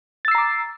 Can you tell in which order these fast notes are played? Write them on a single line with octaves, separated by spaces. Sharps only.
A6 E6 C7 A#5 D6